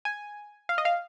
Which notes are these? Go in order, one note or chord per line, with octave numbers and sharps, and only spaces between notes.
G#5
F5
D#5
F5